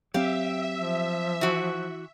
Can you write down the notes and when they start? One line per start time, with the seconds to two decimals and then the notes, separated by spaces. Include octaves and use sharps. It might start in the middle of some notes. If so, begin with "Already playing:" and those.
0.14 F#3 C4 G4 E5 F5
0.78 F3
1.41 E3 F#4